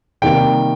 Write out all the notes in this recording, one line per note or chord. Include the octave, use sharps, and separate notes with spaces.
C3 D#3 G3 A#3 G5